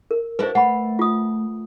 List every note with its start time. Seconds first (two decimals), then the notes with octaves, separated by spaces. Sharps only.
0.11 A#4
0.39 D4 E4 F#4 B4 C5
0.55 A3 F#5 B5
0.99 F4 D#6